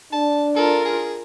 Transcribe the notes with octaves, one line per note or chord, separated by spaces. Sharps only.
D4 A5
F4 A4 A#4
G#4